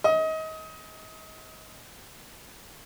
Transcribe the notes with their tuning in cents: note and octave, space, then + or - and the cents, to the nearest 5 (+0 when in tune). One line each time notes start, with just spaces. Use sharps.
D#5 +30